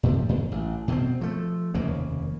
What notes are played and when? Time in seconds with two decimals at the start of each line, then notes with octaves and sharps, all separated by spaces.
0.03 A2 C3 F3
0.29 G#2
0.52 A1
0.88 B2 B3 C4
1.21 F3 A3
1.74 F1 D#2 C#3 A#3